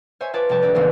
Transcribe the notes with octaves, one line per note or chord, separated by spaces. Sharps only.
C5 C#5 E5 G#5
F4 B4 C#5 G#5 A5 D6
F1 G3 G5 A5 C#6
D2 A4 D5 A#6
A1 D#2 C#3 E3 B3 C5